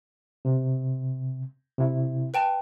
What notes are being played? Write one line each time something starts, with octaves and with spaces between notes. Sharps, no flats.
C3
C3 E4
B4 G5 A5